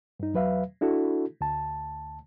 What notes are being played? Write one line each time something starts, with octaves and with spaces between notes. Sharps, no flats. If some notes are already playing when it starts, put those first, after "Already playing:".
G2 D#4
E2 F#3 B4 E5 F5
D4 E4 F#4 A4
D2 A5